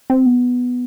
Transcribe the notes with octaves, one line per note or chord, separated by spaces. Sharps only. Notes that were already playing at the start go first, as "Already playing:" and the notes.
C4
B3